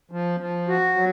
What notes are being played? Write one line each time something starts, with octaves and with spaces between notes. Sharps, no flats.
F3
F3
F#4
F#3